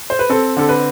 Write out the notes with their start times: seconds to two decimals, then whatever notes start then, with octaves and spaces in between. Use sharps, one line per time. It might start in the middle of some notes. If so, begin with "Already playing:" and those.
0.10 C5
0.19 B4
0.29 C4 A4
0.57 D3 A4
0.69 B4